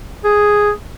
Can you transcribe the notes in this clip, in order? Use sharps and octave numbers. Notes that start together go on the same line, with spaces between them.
G#4